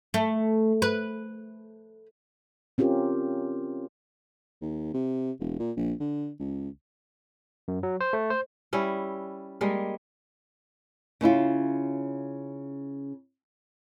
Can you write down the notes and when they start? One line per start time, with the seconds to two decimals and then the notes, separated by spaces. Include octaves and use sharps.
0.14 A3
0.82 B4
2.78 C4 C#4 F4 G4 A#4
4.62 D#2
4.94 C3
5.40 E1
5.60 A#2
5.77 A#1
6.00 D3
6.40 C#2
7.68 F#2
7.83 F#3
8.01 C5
8.13 A3
8.30 C5
8.73 G3 C#4 E4
9.61 G3 G#3 A#3
11.21 C#3 C#4 E4 F4